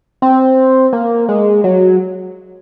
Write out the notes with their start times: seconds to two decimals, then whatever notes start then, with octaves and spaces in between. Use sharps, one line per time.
0.22 C4
0.93 A#3
1.29 G#3
1.64 F#3